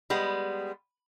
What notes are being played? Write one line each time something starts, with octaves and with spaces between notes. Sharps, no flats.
G3 G#3 B3